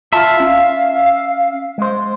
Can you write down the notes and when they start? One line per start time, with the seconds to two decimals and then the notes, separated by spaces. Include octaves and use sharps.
0.13 F4 E5 A5
0.40 C#4 F5
1.78 G#3 C5